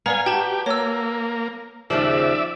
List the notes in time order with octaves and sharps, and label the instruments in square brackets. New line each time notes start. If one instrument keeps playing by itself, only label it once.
[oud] B3 [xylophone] B4 D5 A#5 [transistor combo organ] F5 G#5
[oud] F#4 [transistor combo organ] G4 [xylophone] G5 A5
[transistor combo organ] A#3 [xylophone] C#5 E6
[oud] D#2 C#3 F3 [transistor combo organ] D5 E5